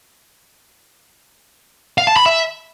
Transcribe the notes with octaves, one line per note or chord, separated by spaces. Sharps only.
F5
A5
B5
E5